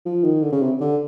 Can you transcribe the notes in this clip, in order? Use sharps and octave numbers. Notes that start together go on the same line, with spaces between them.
F3
D#3
D3
C#3
C3
D3